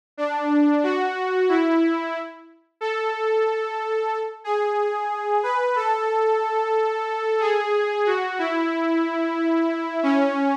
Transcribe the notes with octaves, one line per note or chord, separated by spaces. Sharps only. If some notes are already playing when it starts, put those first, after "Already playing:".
D4
F#4
E4
A4
G#4
B4
A4
G#4
F#4
E4
C#4